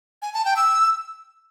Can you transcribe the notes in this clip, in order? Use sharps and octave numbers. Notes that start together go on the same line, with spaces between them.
G#5
A5
G5
E6